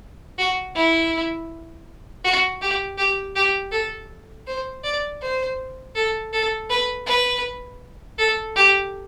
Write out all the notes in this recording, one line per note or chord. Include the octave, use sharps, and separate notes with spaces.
F#4
E4
F#4
G4
G4
G4
A4
C5
D5
C5
A4
A4
B4
B4
A4
G4